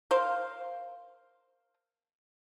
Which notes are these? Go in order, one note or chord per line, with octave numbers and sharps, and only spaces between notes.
A#4 C5 F5